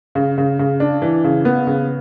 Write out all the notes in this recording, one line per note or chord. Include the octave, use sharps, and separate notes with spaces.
C#3
C#3
C#3
D4
E3
C#3
B3
C#3